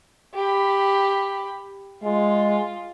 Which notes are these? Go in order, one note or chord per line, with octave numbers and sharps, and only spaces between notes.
G4 B5
G#3 F4